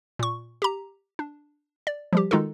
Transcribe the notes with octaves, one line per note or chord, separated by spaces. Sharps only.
A#2 C#6
G4 A#5
D4
D5
F3 G3 G4
D#3 G#3 D#4 F4 F#4 A4